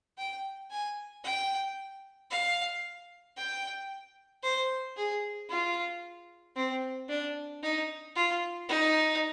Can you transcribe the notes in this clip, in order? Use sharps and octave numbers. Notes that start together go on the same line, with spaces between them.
G5
G#5
G5
F5
G5
C5
G#4
F4
C4
D4
D#4
F4
D#4